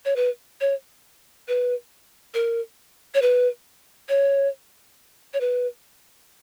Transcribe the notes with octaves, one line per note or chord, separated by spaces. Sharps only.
C#5
B4
C#5
B4
A#4
C#5
B4
C#5
C#5
B4